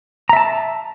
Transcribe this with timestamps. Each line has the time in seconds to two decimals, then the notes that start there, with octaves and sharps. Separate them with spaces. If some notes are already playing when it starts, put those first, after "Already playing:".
0.29 A#5
0.33 E5
0.37 A5